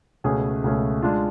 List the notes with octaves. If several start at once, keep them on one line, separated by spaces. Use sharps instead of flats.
C#2 B2 A3 C#4 G#4
C#2 B2 A3 C#4 G#4
G#3 D4 F4